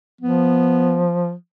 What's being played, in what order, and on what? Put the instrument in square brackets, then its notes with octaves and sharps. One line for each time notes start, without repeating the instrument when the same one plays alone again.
[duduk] F3 [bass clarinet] B3